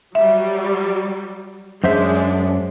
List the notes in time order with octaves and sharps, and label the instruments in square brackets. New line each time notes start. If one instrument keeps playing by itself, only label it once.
[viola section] F#3 G3 [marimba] E5
[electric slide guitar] F#2 C5 E5 [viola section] G#3 D4